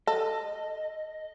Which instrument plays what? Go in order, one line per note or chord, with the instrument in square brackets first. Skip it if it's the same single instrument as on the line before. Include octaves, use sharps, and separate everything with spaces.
[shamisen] A4 [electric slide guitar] D#5